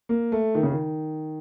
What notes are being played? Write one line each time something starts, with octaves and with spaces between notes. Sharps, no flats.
A#3
A3
D#3
C#3
D#3